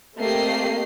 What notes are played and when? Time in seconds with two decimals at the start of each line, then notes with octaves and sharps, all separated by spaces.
0.18 A3 A#3 C4 G4 D#5 C7